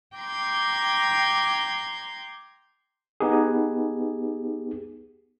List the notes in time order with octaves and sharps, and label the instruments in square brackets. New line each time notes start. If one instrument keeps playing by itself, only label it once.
[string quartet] G5 A#5 C6 D6 G6 G#6
[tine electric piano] B3 D#4 G4 G#4